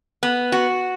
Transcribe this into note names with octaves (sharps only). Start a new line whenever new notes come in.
B3
F#4